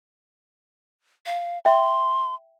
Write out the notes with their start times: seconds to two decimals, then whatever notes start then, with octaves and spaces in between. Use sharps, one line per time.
1.26 F5
1.65 E5 G5 C6